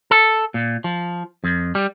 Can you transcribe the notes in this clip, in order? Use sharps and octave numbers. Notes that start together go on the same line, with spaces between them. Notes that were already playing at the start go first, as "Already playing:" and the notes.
A4
A#2
F3
F2
G3